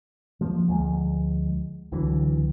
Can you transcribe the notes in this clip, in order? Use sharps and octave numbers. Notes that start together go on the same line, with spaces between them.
F3 A#3
D2 F3 G#3
C#2 D3 E3 F#3